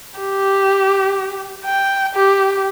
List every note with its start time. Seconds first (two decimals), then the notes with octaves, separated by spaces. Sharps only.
0.19 G4
1.65 G5
2.15 G4